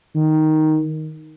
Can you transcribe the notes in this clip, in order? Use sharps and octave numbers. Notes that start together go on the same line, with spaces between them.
D#3